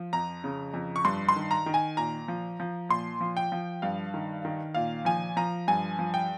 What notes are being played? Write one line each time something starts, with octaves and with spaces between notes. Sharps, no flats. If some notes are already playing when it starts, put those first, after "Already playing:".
Already playing: F3
F2 A#5
C#3
F2
C#6
G2 C6
C6
D#3
A#5
D#3
G#5
A#2 A#5
F3
F3
A#2 C6
F3
G5
F3
G2 F5
D#3
D#3
A#2 F5
F3 G#5
F3 A#5
G2 G#5
F3
G5